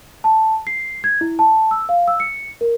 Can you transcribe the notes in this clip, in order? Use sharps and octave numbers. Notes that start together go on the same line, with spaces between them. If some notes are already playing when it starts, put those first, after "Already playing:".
A5
C7
G#6
E4
A5
E6
F5
E6
C#7
A#4